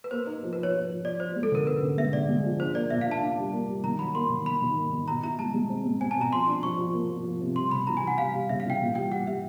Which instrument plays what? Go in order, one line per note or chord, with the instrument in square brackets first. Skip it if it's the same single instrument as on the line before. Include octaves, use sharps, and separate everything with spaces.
[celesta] B4
[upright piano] A#3 [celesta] C5
[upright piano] D#4
F3
[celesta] B4
[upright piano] F3
[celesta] C#5
[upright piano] F3
F3
[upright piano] F3 [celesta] D5
[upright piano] F3 [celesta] C5
[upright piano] G#3
[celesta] A4
[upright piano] D3 [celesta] A#4
[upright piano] C#4 [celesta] B4
[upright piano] D3
[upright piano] G#3 [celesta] E5
[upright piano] D3 [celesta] D5
[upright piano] G#3
F3
[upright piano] D4 [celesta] C5
[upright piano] A#3 [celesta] D5
[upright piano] A#2 [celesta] E5
[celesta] F5
[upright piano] D4
[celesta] A5
[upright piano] D4
G3
A#3
G3
[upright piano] D#3 [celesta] A#5
[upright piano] F#3 [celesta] B5
[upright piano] A#3 [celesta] C6
[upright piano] D#3
[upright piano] D#3 [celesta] B5
[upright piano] D#3
A#3
D#3
[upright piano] B2 [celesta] A#5
[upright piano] E4 [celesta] A#5
[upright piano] G#3 [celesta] A5
[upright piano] G#3
C4
G#3
[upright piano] C4 [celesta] G#5
[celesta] A5
[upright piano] B2 [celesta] A#5
[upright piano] F3 [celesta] C6
[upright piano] D4
[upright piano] F3 [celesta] C#6
[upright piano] F3
A#3
F3
F3
C3
[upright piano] G3 [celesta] C6
[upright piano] C#3 [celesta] B5
[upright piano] E3 [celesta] A#5
[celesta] G#5
[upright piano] E3
[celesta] F#5
[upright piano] G3 [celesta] F5
[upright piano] G3
[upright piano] C#3 [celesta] E5
[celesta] F5
[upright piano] E3
[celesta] G5
[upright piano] A#2
[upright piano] G3 [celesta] G5
[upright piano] G3 [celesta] F#5
[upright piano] G3 [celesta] E5